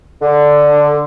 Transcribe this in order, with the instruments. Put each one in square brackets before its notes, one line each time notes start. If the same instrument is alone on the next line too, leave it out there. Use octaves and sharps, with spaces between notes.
[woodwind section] D3